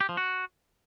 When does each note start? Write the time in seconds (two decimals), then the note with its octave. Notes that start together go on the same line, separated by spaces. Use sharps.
0.01 G4
0.09 F3
0.17 F#4